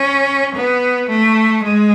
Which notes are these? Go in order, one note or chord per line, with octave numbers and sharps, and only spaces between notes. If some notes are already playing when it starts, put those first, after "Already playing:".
Already playing: C#4
B3
A3
G#3